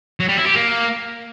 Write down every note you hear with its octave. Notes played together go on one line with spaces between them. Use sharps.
F#3
G3
E4
G4
A#3